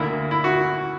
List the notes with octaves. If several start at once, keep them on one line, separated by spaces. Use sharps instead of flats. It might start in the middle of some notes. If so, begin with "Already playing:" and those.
Already playing: D2 D3 A#3 E4
E4
F#4